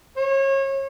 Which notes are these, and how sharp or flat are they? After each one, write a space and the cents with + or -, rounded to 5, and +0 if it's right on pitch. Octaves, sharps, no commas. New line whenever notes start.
C#5 -30